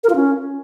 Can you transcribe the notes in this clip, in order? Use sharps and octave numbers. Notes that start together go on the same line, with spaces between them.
A#4
F4
C#4